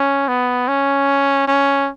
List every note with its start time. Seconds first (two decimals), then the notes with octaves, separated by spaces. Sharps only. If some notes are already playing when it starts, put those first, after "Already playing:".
Already playing: C#4
0.28 B3
0.68 C#4
1.48 C#4